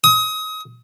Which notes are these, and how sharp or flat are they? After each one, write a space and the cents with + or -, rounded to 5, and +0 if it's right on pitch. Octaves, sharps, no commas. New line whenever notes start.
D#6 +30